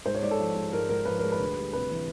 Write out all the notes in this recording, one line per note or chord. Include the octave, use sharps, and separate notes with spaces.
G#2 C5
C#5
G#2 D5
A4
F3
G#3
G#2 A#4
G#2 A#4
F3 B4
G#3 A#4
B4
D2
G3
C3 B4
E3